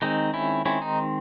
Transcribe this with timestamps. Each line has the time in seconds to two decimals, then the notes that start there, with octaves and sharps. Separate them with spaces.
0.02 D#3 G#3 C4 D#4
0.34 C#4 E4
0.66 D#3 G#3 C4 C#4 E4
0.82 D#4